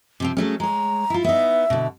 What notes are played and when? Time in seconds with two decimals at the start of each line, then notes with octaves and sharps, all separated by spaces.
0.20 C3 F3 C4
0.37 F#3 A3 C#4 G#4
0.60 G#3 C#5 A#5
1.10 E4 F4
1.24 B3 D#4 E5
1.70 B2 D3